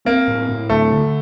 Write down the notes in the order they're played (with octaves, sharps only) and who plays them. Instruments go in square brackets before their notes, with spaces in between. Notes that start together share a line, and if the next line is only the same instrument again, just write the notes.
[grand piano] A#3 [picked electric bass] C4
[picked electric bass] A2
A2
[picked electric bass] D2 [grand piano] A3
[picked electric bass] D3